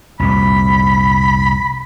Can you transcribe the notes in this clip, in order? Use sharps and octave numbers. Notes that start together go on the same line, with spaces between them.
C2 F2 A#2 B5